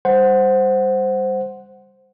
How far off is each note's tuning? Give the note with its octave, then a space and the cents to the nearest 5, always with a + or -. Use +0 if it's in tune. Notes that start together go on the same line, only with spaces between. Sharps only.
G3 +15 C5 +0 F#5 +0